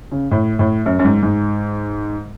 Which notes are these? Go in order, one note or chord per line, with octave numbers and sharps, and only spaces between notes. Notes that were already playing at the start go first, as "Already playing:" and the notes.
C#3
A2
A2
F#2
F#2
G#2
G#2